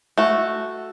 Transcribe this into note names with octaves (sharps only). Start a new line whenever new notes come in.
A3 F#4